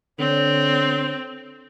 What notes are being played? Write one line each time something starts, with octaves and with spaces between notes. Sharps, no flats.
D3 C4 C#5